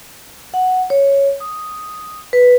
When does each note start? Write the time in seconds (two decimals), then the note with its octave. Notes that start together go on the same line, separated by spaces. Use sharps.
0.54 F#5
0.90 C#5
1.40 D#6
2.33 B4